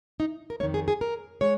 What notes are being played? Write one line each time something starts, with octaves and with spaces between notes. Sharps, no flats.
D#4
A#4
A#3 C#5
F2 D#3
G#4
G#4
A#4
G#3 C#5